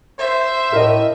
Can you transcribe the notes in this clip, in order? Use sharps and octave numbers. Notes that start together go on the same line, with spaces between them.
C5 E5
A2 A#4 D#5